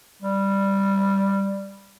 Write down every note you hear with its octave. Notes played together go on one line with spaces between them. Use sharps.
G3